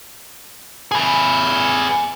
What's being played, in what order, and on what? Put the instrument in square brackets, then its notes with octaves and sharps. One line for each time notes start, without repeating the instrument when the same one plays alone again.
[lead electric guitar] G#4 B4